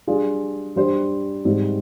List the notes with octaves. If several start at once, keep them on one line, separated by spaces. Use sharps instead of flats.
G3 D4 F4 G#4
G3 D4 G4 C5
G#2 G3 C4